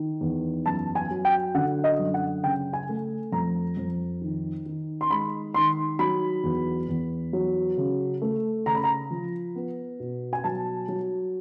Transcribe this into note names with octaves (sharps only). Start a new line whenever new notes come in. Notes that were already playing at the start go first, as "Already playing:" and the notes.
Already playing: D#3
E2
F#2 A5
G#5
F#3
G5
D3 F#5
D#5
F#2
F#5
C#3 G5
G#5
A3
F2 A#5
F2
D#3
D#3
C6
G#3 B5
D#3 C6
F#3 B5
E2
E2
F#3
C#3
A3
C#3 A#5
B5
A#5
F3
B3
B2
G#5
F#3 A5
F#3